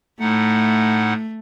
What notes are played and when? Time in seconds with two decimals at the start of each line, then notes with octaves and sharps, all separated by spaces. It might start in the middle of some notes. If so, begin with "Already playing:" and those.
0.20 A2 A3 D#4 F#5